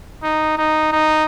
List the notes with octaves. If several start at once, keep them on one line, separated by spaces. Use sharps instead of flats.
D#4
D#4
D#4